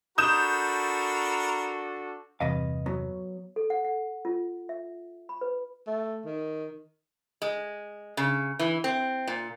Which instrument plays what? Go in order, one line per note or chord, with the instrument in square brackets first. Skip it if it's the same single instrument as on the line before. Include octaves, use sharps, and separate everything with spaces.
[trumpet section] D4 F#4 A4 [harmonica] A#4 B5 [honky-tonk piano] D#6 G6 E7
[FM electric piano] E2 G2 C3 [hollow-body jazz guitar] B4 D#5 F5
[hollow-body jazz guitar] F#3 B3
[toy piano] A4
F#5
F#5
F4
E5
B5
B4
[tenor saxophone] A3
D#3
[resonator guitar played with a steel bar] G#3
C#3
E3
C4
A#2